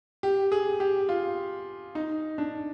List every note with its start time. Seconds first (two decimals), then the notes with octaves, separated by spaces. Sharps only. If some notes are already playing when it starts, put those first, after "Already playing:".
0.23 G4
0.52 G#4
0.80 G4
1.09 F4
1.95 D#4
2.38 D4